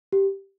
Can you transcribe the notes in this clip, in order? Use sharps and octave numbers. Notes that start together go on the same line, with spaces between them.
G4